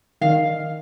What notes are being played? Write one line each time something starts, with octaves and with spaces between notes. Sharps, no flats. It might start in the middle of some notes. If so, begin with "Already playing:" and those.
D#3 F5